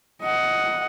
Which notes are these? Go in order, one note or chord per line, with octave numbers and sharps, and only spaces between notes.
D#5 F#5